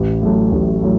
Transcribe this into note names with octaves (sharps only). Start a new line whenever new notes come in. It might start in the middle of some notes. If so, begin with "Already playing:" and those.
Already playing: A1
A2 F#3 A3
A1
A2 F#3 A3